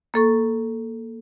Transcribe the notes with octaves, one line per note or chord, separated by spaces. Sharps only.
A#3 A4 C#6